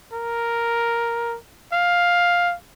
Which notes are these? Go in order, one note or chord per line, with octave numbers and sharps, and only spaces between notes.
A#4
F5